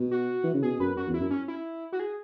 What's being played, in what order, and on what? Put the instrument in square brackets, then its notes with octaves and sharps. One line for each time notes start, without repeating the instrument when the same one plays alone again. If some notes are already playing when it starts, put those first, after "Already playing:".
Already playing: [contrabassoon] B2
[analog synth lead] F#4
[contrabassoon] E3
C#3
[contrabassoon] B2 [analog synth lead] G#4
[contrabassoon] F#2 [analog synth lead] B4
[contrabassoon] F#2 [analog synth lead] F#4
[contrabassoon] E2
[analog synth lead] E4
[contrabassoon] F#2
[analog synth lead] C#4
E4
F#4
G#4